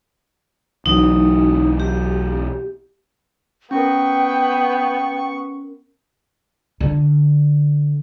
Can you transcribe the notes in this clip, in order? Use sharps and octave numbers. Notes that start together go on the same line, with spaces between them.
B1 E3 F#3 D#4
G4
B3 C#4 A#4 G5 C#6
D3